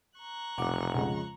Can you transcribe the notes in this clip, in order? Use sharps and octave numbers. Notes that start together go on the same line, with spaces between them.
A#5 C#6 F#6
F1 B1 F#5 D6
F2 C#3 G#3